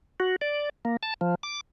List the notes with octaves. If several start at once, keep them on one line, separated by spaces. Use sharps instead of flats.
F#4
D5
A#3
A5
F3
D6